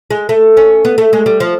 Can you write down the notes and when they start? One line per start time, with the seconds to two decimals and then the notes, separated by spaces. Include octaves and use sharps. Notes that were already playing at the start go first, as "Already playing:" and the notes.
0.11 G#3
0.29 A3
0.57 C#4
0.85 B3
0.98 A3
1.13 G#3
1.26 G3
1.40 F3